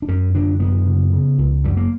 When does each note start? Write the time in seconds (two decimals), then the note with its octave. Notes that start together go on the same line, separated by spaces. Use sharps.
0.02 D4
0.08 F#2 C#4
0.35 D3 D4
0.60 F#2 B3
0.86 C#3
1.13 C#3
1.38 C#2
1.64 F#2 G3
1.77 A#3